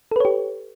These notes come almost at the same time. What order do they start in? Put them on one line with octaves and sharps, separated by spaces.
A4 B4 C#5 G4